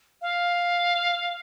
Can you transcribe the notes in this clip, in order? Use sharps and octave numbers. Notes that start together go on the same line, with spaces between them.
F5